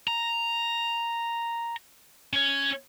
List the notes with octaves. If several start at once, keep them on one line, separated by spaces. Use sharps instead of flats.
A#5
C#4 C#5